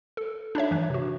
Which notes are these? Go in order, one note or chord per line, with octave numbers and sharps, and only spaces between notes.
A4
D4 D#4 C#5 E5
G2 E3 B4
C3 F#4